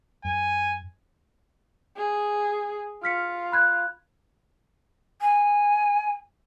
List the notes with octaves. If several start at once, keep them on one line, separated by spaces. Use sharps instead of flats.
F#2 G#5
G#4
F4 F6 B6 C#7
B5 F#6 G#6
G#5